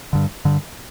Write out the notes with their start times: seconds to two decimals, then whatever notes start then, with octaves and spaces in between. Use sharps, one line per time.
0.13 G2 D3
0.45 G2 D3